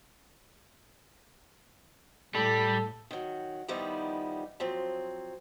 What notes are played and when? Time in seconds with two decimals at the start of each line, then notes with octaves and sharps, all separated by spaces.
2.35 A2 G3 A4
3.11 D#3 F#3
3.68 D#3 F3 G3 B3 D#4 E4
4.60 F3 F#3 C4